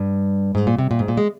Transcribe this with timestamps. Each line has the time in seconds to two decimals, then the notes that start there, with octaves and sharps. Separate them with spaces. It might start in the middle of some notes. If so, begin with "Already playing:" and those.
Already playing: G2
0.55 G#2
0.67 A#2
0.78 C3
0.91 A#2
0.99 G#2
1.08 A#2
1.17 G#3